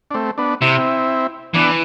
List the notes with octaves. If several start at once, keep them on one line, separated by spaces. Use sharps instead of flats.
D4
A3 C4
B3 D4
C3 C4 E4
E3 B3 D4